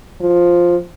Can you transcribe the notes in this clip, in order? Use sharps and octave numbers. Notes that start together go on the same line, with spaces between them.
F3